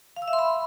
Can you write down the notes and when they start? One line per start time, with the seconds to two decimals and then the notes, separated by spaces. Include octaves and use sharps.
0.16 F5
0.22 E6
0.28 E5
0.33 C6
0.39 B5